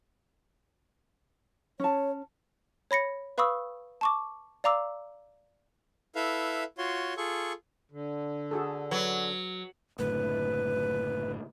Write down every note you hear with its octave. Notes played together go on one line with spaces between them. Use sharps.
C#4 C#5 A5
C#5 B5 A#6 C#7
B4 F5 B5 C#6 D#6 E6
A5 C#6 D6
D5 F5 A#5 D6 E6
E4 A4 B4 E5 F5
F4 F#4 C#5 C6
F4 G#4 A4 C#6
D3
F#4 G#4 A4
F#3 B4 C#5
F#1 A2 D3 B4